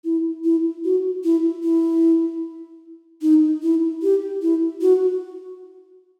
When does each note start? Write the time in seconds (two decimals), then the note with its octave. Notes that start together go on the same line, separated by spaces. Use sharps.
0.05 E4
0.44 E4
0.84 F#4
1.24 E4
1.64 E4
3.22 D#4
3.63 E4
4.03 G4
4.42 E4
4.81 F#4